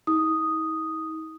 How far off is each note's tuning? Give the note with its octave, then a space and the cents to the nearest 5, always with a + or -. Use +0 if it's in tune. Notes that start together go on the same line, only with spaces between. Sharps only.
D#4 +45 D#6 +0